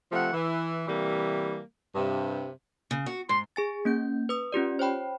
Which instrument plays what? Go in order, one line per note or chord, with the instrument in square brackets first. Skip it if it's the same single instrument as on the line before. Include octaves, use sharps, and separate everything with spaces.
[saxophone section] C3 F3 A3 F#5
E3
C3 E3 G3 A#3
G2 C3
[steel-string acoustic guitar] C#3
F#4
[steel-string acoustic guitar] G#2 [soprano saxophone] C6
[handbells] G#4 G#5 A6
A#3 C#4 G6
B4 D#6
C#4 F4 G4 D5
C5 C#5 G5 B5